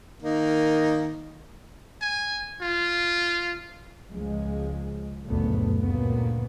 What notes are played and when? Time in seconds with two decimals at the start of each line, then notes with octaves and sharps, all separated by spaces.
0.23 D#3 A#3 D#4
2.01 G#5
2.62 F4
4.10 C#2 F3 G#3
5.25 F#1 D2 G2 A#2 A3 B3
5.79 D2 G2 A#2 C#3 A#3 B3